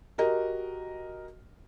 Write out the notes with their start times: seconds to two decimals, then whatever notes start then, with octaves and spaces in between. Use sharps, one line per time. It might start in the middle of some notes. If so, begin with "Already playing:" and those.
0.18 F#4 G4 A#4 D#5